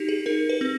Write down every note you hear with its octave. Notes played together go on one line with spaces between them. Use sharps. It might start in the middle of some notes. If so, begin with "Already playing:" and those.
Already playing: D#4 F#4 G4
G#4
D#4 A#4
B4
C4